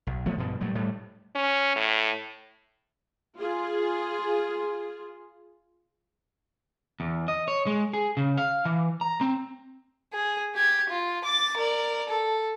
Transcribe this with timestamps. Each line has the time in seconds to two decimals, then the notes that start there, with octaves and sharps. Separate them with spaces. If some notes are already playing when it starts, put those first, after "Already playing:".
0.07 B1
0.26 F3 A3 B3
0.38 G2 B2
0.61 A#2 F#3 G3 A3
0.75 A2 G3 A3
1.35 C#4
1.76 A2
3.38 F4 G#4
7.00 E2
7.28 D#5
7.48 C#5
7.67 G#3
7.93 G#4
8.17 C#3
8.38 F5
8.65 E3
9.01 A#5
9.21 C4
10.13 G#4
10.55 G4 G#6
10.89 F4
11.25 D6 A6
11.57 A#4 D5
12.09 A4